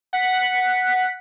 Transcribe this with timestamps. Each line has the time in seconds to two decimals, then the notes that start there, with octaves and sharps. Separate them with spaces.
0.13 F#5 B6